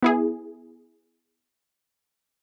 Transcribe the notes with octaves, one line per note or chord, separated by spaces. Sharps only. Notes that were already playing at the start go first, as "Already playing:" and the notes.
B3 E4 G#4